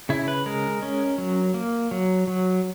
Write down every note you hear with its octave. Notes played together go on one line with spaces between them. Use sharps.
C#3 E4
B4
G#3 A#4
C#4
F#3
A#3
F#3
F#3